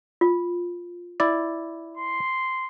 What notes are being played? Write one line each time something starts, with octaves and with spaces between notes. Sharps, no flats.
F4
E4 D5
C6